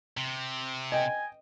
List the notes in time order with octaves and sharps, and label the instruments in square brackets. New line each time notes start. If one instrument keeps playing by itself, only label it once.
[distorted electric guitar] C3
[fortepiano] D#5 G5 [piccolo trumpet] G#5